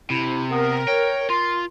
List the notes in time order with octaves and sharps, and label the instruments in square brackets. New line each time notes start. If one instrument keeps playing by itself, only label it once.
[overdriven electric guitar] C3 [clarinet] E4
[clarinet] B3 [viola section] A#4
[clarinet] C#5 [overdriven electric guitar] G5
[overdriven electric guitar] F4 [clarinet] C6